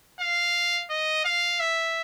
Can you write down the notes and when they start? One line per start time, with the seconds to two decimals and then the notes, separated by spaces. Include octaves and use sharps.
0.20 F5
0.90 D#5
1.25 F5
1.60 E5